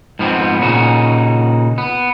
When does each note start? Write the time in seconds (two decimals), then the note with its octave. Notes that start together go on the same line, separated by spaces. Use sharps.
0.19 G#2 F3 B3 C4
0.61 A#2 C#3 D#4 F#4
1.78 B3